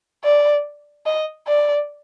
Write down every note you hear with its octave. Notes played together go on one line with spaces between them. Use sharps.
D5
D#5
D5